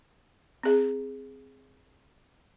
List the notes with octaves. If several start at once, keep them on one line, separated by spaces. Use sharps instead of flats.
C4 G#4